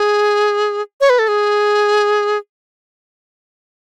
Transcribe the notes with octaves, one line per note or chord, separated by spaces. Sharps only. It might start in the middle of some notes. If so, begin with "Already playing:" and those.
Already playing: G#4
C#5
B4
A4
G#4